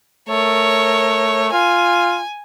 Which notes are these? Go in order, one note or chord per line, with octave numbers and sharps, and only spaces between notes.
A3 A#4 C#5
F4 G#5